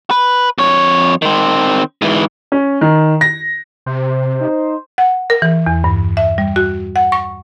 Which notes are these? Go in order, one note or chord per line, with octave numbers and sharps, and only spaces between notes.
B4
F2 C#5
D#3 C4
G#2 E3
C#4
D#3
A#6
C3 C5
D#4
F#5
A#4
E3
E2
G2
E5
G3
F#4
F#5
C#6